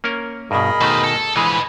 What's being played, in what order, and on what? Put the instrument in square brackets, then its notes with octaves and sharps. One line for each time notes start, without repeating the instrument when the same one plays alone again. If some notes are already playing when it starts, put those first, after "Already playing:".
[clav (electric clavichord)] A#3 C#4 A#4
[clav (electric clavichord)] G2 B2 [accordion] G#4 A#4 D#5 [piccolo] B5
[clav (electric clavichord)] B2 D#3 A3 [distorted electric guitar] B4 C5
[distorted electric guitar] A4
[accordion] D3 F3 [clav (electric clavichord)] E3 G#3 G#4 [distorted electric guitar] B4 D#5 [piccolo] B5